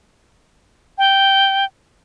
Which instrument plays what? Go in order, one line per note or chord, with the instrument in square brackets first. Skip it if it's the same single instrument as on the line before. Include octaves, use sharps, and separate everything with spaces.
[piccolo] G5